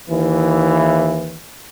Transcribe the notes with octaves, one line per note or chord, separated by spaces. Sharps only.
D#2 E3